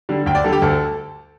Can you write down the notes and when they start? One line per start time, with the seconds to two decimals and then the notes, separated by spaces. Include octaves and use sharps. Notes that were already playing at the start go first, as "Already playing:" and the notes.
0.09 D3 G3
0.26 D2 G5
0.35 D5
0.44 D3 G3 A4
0.53 G4
0.62 D2 A4